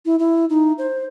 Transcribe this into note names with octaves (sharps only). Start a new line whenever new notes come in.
E4
E4
D#4
C5